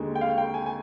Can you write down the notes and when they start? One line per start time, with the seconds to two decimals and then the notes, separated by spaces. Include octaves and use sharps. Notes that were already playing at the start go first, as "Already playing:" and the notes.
Already playing: D#2 D3 G#3
0.15 G5
0.21 F5
0.38 G5
0.54 G#5
0.66 G#5